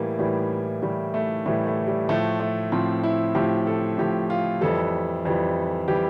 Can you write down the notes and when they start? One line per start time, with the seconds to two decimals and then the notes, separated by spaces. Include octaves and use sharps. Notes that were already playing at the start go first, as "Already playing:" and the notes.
Already playing: A2 E3 G3 A#3
0.19 A2 E3 G3
0.82 A2 E3 G3
1.14 A3
1.46 A2 E3 G3 A3
1.67 A3
1.87 G3
2.09 A2 F3 A3
2.40 A3
2.72 A2 F3 C4
3.03 E4
3.35 A2 F3 G4
3.67 A4
3.98 A2 F3 G4
4.30 F4
4.61 F2 E3 G3 A4
5.25 F2 E3 G3
5.88 E3 G3 G4